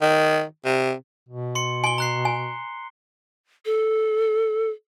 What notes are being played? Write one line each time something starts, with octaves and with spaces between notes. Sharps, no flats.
D#3
C3
B2
C6 C#7
G#5 C6 G7
A#5 F#6 C7
G#5
A4